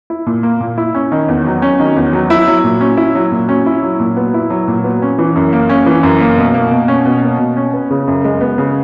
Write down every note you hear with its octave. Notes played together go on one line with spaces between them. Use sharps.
E4
A#2
A#3
A#2
E4
C#4
D#3
E2
F#3
C#4
D#3
E2
F#3
E4
F#3
A#2
C#4
E4
F#3
A#2
C#4
E4
F#3
A#2
B3
E4
F#3
A#2
B3
C#4
E3
F#2
A#3
C#4
E3
F#2
A#3
B2
A#3
B2
C#4
B2
A#3
B2
C#4
B3
C#3
F#2
G#3
B3
C#3